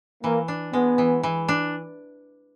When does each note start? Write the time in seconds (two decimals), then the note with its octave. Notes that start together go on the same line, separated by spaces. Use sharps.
0.23 E3 A#3
0.48 D4
0.73 G#3 B3
0.98 E3
1.23 E3
1.48 D4